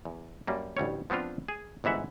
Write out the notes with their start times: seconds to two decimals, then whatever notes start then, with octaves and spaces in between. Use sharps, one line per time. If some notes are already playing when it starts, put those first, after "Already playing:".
0.05 E2
0.47 F#2 G3 A#3
0.77 A1 D2 G3 C#5
1.10 F3 B3 C4 D4 F4
1.48 G#4
1.84 G1 G#2 E3 E5 F#5